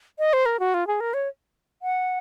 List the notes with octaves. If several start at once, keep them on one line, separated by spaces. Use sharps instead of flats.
D#5
C5
A#4
F#4
F4
G#4
A#4
C#5
F#5